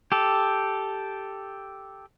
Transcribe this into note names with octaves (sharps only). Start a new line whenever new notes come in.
G4 A4